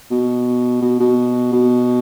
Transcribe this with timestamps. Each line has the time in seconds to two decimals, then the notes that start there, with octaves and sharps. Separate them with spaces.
0.11 B2
0.82 B2
1.00 B2
1.52 B2